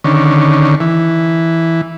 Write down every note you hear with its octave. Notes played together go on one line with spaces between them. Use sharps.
D3 D#3 C#4
E3